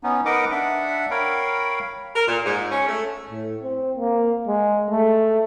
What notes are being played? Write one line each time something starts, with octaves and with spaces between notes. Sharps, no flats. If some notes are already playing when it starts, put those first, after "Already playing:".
B3 C#4 D#4
D#4 A#4 B4 D#5 F#5 D6
D4 E5 F#5
A#4 C#5 F5 G5 B5
A#4
A#2
G#2
C#4
A3
A2
C4
A#3
G#3
A3